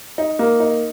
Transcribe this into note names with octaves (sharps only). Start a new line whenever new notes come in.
D#4
A#3
D#4